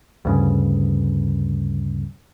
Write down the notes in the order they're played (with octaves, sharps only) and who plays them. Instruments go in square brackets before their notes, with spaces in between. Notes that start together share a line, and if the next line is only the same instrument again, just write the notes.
[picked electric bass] D2 G2 C#3